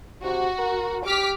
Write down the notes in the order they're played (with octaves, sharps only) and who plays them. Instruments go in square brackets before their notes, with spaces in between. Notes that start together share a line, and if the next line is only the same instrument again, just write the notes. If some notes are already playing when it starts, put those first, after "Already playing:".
[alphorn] C3 [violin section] F#4
[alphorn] A#4
[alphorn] G4 [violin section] D6 F6 B6